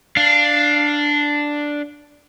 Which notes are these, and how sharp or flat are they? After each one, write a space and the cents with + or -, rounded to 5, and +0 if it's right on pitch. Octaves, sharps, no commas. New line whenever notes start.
D4 +0 F5 +0